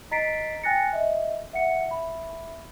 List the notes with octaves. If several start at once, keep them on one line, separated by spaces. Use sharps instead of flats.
D#5 A#5 A6 B6 C7 D7
G5 G#5 F#6 A6 A#6 C#7
D#5 E5
E5 F#5 C#7
E5 B5